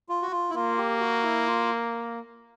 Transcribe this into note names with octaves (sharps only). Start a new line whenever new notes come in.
F4
F#4
F4
E4
A#3 F4
G4
F#4
E4
F4